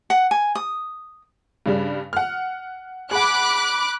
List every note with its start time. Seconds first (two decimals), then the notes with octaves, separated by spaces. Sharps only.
0.10 F#5
0.31 G#5
0.55 D#6
1.66 G2 C#3 G3
2.13 F#5 F6
3.11 G#4 F#5 B5 D6 F#6